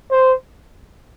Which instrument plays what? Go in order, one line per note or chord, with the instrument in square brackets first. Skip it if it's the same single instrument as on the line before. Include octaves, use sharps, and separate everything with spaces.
[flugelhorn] C5